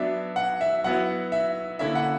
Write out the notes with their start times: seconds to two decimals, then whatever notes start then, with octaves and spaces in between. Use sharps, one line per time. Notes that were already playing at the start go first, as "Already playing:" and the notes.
Already playing: F#3 B3 D4 E5
0.36 F#5
0.61 E5
0.84 F#3 B3 E4 F#5
1.32 E5
1.79 D3 A#3 C#4 E4 E5
1.95 F#5